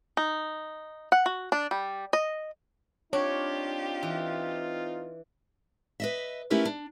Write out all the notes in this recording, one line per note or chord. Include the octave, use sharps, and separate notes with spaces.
D#4
F#5
F#4
D4
G3
D#5
C4 D4 D#4 F4 G4 C#5
E3
B4 D#5 E5
A3 C#4 E4 G4 A#4 B4
D4